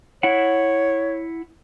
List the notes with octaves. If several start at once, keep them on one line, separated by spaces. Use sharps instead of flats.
E4 C#5 F#5